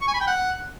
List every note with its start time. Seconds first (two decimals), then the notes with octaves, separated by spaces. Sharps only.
0.01 C#6
0.08 G#5
0.14 B5
0.21 G5
0.27 F#5